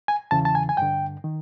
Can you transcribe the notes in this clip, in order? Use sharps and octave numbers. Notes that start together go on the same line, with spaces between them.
G#5
E2 C#3 E3 A5
A5
G#5
G#5
G2 D3 G5
D#3